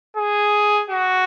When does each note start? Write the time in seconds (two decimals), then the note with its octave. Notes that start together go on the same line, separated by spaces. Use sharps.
0.17 G#4
0.90 F#4